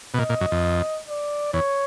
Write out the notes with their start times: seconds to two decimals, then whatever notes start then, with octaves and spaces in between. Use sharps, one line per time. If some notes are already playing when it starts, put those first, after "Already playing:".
0.14 B2
0.18 A#2 D#5
0.29 A#2
0.41 F#2
0.52 F2
1.08 D5
1.53 E2 C#5